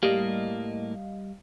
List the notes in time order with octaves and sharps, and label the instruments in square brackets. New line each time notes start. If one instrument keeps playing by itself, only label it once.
[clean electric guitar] A2 A#3 [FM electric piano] G3 D#5 F5